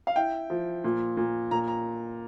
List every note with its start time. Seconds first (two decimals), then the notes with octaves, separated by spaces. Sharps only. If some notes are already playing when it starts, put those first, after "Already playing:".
0.07 F5
0.16 E4 G5
0.50 F3
0.84 A#2
1.17 A#2
1.51 A#2 A#5
1.68 A#5